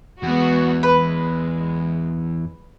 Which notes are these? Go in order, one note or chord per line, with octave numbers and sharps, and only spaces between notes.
E2 G#3 B3 F#4
G#3 B4